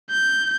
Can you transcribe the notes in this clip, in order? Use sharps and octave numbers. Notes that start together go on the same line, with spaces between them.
G6